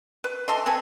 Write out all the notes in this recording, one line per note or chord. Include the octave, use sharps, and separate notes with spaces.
B4
E3 A4 D#5 C6
C4 A4 B4 G#5